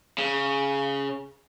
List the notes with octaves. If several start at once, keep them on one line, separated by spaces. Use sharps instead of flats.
C#3